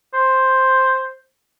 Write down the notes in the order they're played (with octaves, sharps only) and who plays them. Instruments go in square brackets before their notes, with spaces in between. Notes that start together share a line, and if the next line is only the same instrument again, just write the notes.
[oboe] C5